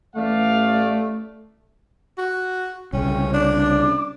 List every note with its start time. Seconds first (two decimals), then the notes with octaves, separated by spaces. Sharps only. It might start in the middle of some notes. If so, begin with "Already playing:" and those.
0.16 A1 A3 D5 F5
2.18 F#4
2.93 C2 C#3 C#4 G5
3.34 D4 D6